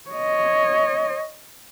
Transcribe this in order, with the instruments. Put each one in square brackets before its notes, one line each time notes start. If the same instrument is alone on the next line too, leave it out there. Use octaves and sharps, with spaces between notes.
[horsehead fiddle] C#5 D#5